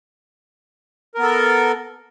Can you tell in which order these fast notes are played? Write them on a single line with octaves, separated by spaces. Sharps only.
A#4 B3 A4